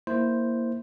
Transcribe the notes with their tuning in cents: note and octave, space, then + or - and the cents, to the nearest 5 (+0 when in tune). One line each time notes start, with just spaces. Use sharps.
A#3 +0 E4 +0 C5 +0